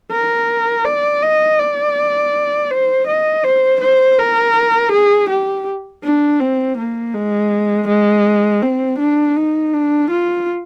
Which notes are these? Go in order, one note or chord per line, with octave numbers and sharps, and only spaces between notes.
A#4
D5
D#5
D5
C5
D#5
C5
C5
A#4
G#4
G4
D4
C4
A#3
G#3
G#3
C4
D4
D#4
D4
F4